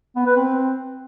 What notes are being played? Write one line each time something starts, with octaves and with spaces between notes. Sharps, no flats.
B3
B4
C4